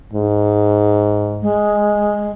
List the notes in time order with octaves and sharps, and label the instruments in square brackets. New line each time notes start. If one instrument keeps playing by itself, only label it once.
[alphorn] G#2
[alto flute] G#3